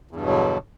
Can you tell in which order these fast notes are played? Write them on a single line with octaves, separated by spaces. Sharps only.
E2 G2 B2 F#3 D3